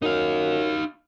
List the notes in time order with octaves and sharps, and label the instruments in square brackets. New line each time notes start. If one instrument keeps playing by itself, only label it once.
[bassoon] F#2 [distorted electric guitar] D#4 F5